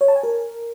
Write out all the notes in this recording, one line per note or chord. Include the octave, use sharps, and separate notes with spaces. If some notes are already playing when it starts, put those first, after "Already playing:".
C#5
A5
G#5
A#4